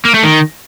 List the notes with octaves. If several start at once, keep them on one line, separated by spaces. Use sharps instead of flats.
A#3
A3
D#3